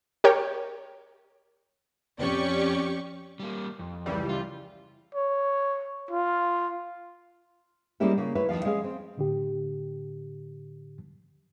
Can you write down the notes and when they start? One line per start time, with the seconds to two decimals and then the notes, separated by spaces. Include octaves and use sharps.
0.24 G4 A#4 C#5 G5
2.18 F2 C#4 G4 D5 C#6
3.40 G3 A#3
3.79 F2
4.06 C#2 E3 G3
4.29 F4
5.15 C#5
6.11 F4
8.00 G3 G#3 A#3 C#4 E4 G4
8.17 C#3 A#3
8.35 E4 B4 C#5
8.49 D#2 E3 F3 F5
8.65 G#3 C#4 G#4 F5
8.84 C4
9.17 A2 D3 G4